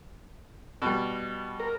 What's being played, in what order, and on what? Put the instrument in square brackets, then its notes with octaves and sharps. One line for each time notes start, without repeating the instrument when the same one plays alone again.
[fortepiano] B2 G3
[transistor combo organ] A#4